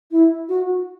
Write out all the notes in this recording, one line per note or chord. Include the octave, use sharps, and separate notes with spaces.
E4
F#4